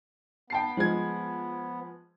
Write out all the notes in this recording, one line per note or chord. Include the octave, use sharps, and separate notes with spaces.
B3 G5 A5 C7
F3 G#3 G#6